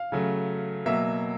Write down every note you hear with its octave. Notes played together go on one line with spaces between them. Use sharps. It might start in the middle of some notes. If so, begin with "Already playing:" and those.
Already playing: F5
C#3 F#3 A3
B2 F#3 A#3 E5